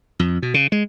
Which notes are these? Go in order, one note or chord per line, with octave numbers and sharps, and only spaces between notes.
F2
B2
C#3
G#3